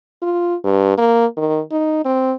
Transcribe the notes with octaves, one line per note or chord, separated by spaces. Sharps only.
F4
G2
A#3
D#3
D#4
C4